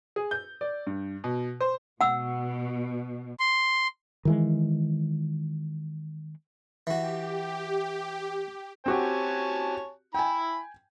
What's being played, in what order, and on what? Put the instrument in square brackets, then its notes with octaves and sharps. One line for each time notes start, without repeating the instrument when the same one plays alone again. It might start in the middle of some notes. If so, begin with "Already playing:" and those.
[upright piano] G#4
G6
D5
G2
B2
C5
[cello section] B2 [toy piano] F#5 E6
[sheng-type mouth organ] C6
[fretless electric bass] D#3 E3 G#3
[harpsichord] E3 F#4 [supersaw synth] G4
[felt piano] C4 F#4 G4 [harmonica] C#5 G#5 A5
[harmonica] E4 B5 [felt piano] G5 G#5